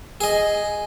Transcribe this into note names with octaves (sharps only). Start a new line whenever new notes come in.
G#4 D#5